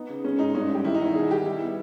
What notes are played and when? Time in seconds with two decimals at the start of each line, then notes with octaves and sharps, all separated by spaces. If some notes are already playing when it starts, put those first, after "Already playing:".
Already playing: B3 D#4
0.09 C#3
0.24 G#3 C#4
0.39 G#2 D#4
0.54 G2 C#4
0.70 G2 G4
0.84 D#3 E4
0.94 D#4
1.00 E2 E4
1.15 B2 G#4
1.30 G3 G4
1.45 G3 E4
1.61 B3